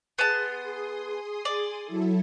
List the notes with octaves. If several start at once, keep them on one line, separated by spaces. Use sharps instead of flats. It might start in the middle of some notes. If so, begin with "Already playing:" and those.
B3 G#4 A5 C6 D#6
D5
F#3 E4 A4